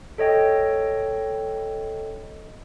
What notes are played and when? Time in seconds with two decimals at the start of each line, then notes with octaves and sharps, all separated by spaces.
0.18 A4 C#5 D#5 G5